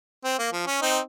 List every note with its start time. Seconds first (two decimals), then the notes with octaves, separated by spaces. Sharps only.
0.24 C4
0.39 A#3
0.52 F3
0.67 C#4
0.82 C4 D#4